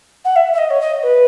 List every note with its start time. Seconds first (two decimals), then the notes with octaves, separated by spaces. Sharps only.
0.24 F#5
0.35 E5
0.52 E5
0.58 D#5
0.70 C#5
0.80 D#5
1.02 B4